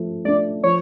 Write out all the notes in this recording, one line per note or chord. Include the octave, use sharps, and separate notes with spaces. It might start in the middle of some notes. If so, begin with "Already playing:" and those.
Already playing: F3 A3
A3 D4 D5
F3 C#5